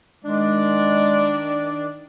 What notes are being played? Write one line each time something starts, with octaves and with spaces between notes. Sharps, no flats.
D#3 G#3 D4 D5